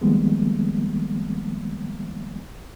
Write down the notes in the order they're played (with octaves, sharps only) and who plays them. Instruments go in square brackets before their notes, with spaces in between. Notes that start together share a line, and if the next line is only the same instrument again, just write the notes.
[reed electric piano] D#3 F3 G3 G#3 A#3 B3